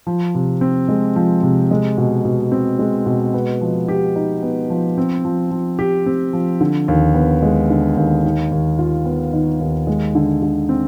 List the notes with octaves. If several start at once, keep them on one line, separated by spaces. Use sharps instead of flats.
F3
C3
C4
G#3
F3
C3
G#3
B2
B2
C4
G#3
B2
B3
F3
G4
D#4
B3
F3
C4
F3
F3
G4
C4
F3
D3
D#2
B3
G#3
D3
D#2
D#3
D#2
F4
B3
D#3
D#2
G#3
D3
D3
C4